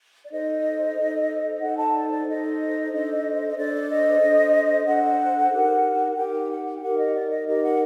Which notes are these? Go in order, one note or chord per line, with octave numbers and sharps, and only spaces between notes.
D5
D#4 A4 C5 D#5
D#4 A4 C5
D#4 A4 C5 F#5
A5
D5
D5
D#4 A4 C5 D#5
D4 A4 C5
D#5
D4 A4 C5 D5
D#5
D4 A4 C5
D4 A4 C5 F#5
D#4 G4 A#4
D#4 G4 A#4 G5
F#5
G5
D#4 G4 A#4 F#5
D#5
D5
D#5
D#4 G4 A#4 D#5
F#5